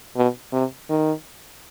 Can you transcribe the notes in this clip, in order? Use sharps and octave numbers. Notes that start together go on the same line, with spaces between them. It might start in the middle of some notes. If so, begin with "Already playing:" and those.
B2
C3
D#3